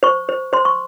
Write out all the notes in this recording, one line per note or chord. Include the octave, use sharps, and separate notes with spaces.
C5 C#6
C5
C5 C6
C#6